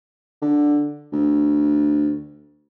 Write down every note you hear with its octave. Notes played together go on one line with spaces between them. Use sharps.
D3
D2